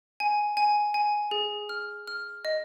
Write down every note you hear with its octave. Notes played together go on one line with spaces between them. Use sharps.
G#5
G#5
G#5
G#4
F6
F6
D#5